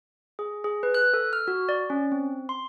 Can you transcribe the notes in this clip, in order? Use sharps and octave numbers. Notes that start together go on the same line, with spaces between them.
G#4
G#4
B4
F#6
A4
F6
F#4
D5
C#4
C4
C6